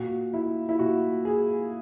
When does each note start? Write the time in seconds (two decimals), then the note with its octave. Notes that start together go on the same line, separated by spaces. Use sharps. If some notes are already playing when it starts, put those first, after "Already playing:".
Already playing: A#2 F#4
0.34 E4
0.69 E4
0.79 A#2 F#4
1.25 G#4